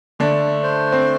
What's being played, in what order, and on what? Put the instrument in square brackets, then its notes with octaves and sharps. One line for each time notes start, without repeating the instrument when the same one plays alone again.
[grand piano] D3 D4 [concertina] A3
[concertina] C5
[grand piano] C4